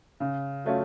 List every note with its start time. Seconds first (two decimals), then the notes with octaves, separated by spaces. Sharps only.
0.20 C#3
0.65 F#3 A3 C#4 F4